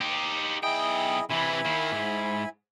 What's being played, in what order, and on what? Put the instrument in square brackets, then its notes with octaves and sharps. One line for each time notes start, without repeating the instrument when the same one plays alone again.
[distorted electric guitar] D#4 G4
[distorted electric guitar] B1 G5 [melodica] E4 G#4 D#5
[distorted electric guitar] C3 E3 [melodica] E4 G#5 B5
[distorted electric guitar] D#3 A#3
G#2